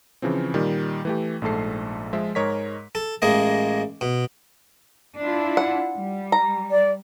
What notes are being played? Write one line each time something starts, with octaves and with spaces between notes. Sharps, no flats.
C#3 E3 F3 C4
A#2 D#3 G3
E3 A3 G4
A#1 G#2 A3 A4 C7
F3 G#3 F4 E5
G#2 G#3 A#4 C#5 D#5 B6
A4
A1 G#3 A#3 D#5
B2
D4 E4 F4
F#5
G3
A#5
D5